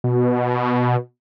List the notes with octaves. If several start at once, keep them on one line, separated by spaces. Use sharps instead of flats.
B2